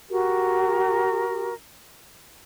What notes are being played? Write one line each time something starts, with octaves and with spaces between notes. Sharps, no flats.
F#4 G4 A#4